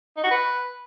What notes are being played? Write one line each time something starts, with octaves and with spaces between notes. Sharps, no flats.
D#4
F#4
B4